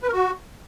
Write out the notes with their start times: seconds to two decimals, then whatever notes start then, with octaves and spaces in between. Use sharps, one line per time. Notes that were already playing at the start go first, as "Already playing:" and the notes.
0.03 B4
0.08 A#4
0.13 F#4